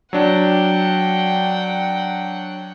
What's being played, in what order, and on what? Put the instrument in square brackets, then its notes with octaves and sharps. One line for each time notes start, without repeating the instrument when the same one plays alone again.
[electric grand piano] F#3 D4 [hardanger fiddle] F#5 G5